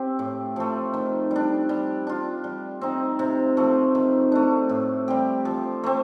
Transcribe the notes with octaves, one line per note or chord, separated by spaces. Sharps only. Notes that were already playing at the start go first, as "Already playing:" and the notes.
Already playing: C4 G4
A2
F3 A3
D#3
G3 D4
G3
D4 F4
G3
C4 D#4
C3
F3 A3
D#3
A3 D4
A2
G3 C4 G4
F3
A3 C4